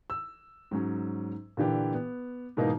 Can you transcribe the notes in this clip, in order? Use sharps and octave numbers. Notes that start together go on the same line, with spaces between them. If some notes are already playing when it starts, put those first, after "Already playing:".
E6
G#2 F#3 C#4
A#2 D3 E3 G4
B3
G#2 B2 E3 A#3 B3 D#4